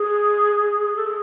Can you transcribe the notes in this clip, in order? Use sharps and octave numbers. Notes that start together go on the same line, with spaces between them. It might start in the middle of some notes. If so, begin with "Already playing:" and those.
Already playing: G#4
A4
G#4